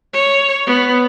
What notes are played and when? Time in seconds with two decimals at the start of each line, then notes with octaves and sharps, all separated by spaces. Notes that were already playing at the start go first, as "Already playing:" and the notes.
0.13 C#5
0.66 B3